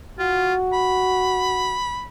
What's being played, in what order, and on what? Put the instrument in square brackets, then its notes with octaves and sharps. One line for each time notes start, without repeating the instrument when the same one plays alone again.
[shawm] F4 [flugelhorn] F#4
[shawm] B5